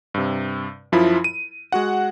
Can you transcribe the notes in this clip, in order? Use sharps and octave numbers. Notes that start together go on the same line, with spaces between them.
G2 C3
F#2 F3 E4 F4 B5
D#7
G#3 F#4 F#5